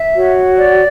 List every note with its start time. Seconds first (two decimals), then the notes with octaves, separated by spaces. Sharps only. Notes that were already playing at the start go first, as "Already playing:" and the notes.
Already playing: E5
0.15 F#4 C#5
0.57 D5